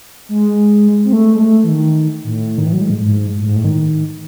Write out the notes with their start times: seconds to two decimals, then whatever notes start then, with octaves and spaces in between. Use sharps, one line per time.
0.29 G#3
1.04 C4
1.13 A3
1.35 G#3
1.40 A3
1.64 E3
1.69 D#3
2.24 A2
2.58 D#3
2.66 E3
2.72 F#3
2.81 G#3
2.90 A2
3.00 G#2
3.37 A2
3.47 G#2
3.56 A2
3.64 D#3